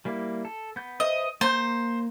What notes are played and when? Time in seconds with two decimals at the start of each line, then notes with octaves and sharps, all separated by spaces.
0.05 G3 A#3 E4
0.45 A4
0.76 B3 G6
1.00 B4 C5 D#5 E5
1.41 A#3 C5 G6